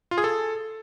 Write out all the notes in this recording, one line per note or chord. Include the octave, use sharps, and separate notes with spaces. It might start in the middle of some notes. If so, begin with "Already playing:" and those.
F4
G#4
A4